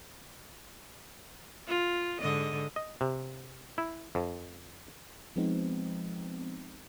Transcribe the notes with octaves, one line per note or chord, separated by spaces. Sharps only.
F4
G#2 D3 D#5
D#5
C3
E4
F2
F3 G#3 B3 C4 D#4